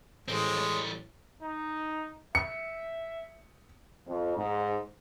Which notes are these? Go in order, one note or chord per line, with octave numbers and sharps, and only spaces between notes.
A1 A2 G#3 C4 F#4 A#4
G3 C#5
D#4
E5 C#7
F2
G#2